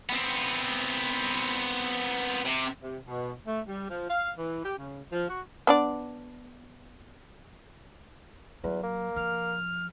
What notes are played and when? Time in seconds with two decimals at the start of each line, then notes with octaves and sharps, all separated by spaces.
0.09 B3 C4
2.46 C3
2.82 C3
3.06 B2
3.45 A3
3.67 G3
3.90 F3
4.09 F5
4.37 E3
4.64 G4
4.78 C#3
5.12 F3
5.28 F#4
5.67 B3 D4 D5
8.64 E2 F#3
8.83 A#3
9.16 F3 F6